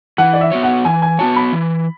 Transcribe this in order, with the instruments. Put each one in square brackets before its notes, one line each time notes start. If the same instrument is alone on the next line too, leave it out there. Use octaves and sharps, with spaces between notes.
[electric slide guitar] E3 [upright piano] F#5
[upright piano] D5
E5
[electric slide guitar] B3 F#4 C#5
[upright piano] F#5
[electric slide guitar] E3 [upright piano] G#5
[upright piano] G#5
[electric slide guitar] B3 F#4 C#5 [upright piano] A5
[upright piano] B5
[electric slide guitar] E3